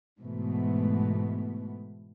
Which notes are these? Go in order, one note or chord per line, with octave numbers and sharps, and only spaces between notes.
G#2 B2 E3 A3 B3